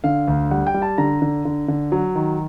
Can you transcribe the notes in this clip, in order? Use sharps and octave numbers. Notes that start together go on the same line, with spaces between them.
D3 F5
D2
G3 F#5
G5
G3
A5
D3 A#5
D3
D3
D3
F#3
D#3